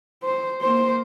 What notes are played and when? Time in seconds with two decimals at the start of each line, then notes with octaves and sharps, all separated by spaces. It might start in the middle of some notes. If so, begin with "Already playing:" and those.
0.24 C5
0.62 A#3 C5